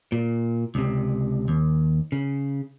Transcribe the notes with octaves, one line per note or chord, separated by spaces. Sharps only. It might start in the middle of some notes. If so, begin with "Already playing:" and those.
A#2
C#2 C3
D#2
C#3